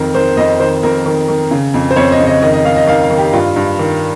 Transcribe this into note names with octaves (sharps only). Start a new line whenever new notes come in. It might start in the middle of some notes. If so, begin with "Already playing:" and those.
Already playing: F2 D#3 A#4
D#3 C5
F2 D#5
D#3 C5
F2 A#4
D#3
D#3
C#3
F2
C5
F2 C#5
D#5
C#3
D#5
D#3 D#5
D#5
D#3 F5
D#5
D#3 F5
F5
D#3
G4
G2 F4
G2
D#3